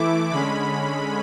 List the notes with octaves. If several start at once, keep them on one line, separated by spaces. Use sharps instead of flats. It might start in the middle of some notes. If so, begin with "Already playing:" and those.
Already playing: E3 A3 E4 D6
D3 G#3 C#4 B5